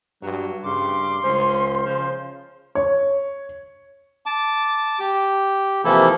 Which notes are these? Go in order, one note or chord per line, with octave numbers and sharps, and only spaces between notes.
G2 F#3
G2 C#3 C6 D6
C#2 C#4 C5
C#3 F3
C#5
A5 D6
G4
C3 E3 F3 A#3 E4 A4